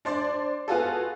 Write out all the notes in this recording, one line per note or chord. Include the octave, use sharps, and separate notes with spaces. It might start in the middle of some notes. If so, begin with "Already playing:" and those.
D4 C5 D5
B3 F4 F#4 G#4 A4